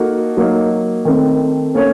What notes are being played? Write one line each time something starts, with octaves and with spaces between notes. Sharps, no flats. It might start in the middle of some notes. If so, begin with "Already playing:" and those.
Already playing: A#3 D#4 F#4 A4
F#3 A#3 D#4
D#3 A3 C4
A#3 C#4 A4 C#5